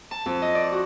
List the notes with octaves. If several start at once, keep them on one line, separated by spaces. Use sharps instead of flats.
A5
F2
D#5
D5
F#4